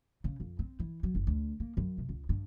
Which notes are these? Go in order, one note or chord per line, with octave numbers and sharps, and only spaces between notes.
C#3
F2
C4
E3
F#3
F#1
D2
A#3
F#2
C3
C#2
G2